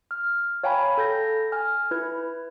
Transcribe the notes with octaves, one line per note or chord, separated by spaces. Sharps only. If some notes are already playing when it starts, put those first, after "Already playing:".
F6
C#5 F5 G5 G#5 A#5 B5
A4 G6 A#6
G#5 F6
E4 B4 G#6